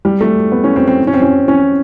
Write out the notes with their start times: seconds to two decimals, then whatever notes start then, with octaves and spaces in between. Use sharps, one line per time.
0.05 G3
0.21 A3
0.52 B3
0.64 C#4
0.76 C4
0.88 C4
1.07 C#4
1.14 C4
1.22 C#4
1.48 C#4